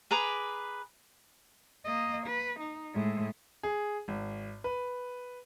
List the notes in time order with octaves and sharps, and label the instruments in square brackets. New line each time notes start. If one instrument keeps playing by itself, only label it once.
[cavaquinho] G#4 B4 A#5 D6
[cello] A#3 D#5
B4
D#4
A2 G#3
[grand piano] G#4
G#1
B4